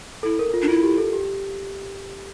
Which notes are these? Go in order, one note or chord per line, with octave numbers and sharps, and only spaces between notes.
E4 A4
A#4
F4
D4
E4 F4
G4
A4
G4